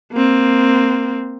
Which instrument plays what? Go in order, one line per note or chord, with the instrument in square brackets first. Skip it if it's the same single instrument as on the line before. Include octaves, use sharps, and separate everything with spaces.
[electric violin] A#3 C4